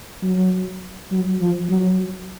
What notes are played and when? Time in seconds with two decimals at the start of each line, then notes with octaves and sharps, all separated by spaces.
0.23 F#3
1.12 F#3
1.42 F3
1.70 F#3